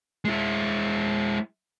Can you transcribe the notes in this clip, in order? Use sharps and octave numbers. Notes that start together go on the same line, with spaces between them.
G#3 E4